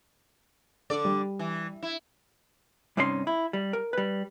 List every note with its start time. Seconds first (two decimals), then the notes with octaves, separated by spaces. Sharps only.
0.90 D3 A4 D5
1.05 G3
1.39 E3
1.83 E4
2.97 G2 C3 C#4 D#4 F#4 C6
3.27 E4
3.53 G3
3.73 A#4
3.93 G3 B4